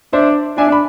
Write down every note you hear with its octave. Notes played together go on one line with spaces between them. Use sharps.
D4 C5 E5
D4 E5 G#5
B5